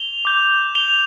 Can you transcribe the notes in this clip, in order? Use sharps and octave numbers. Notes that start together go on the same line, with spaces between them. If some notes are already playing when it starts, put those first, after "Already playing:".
Already playing: F7 G7
D6 G6
F7 G7